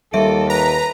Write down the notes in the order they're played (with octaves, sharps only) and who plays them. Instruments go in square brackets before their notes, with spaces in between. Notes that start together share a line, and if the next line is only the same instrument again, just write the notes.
[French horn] D#2 [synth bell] G3 E5 D7 [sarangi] A4
[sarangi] B4 [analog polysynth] A#5